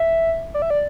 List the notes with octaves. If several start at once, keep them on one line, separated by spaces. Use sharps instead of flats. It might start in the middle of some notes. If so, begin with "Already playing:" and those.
Already playing: E5
D5
E5
D5